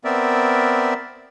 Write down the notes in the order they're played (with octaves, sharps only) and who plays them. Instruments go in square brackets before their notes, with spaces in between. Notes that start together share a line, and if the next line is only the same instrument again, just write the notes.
[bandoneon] B3 C4 A#4 D5 E5